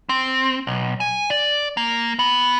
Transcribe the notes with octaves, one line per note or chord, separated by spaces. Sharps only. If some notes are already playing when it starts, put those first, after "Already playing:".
C4
B1
G#5
D5
A#3
B3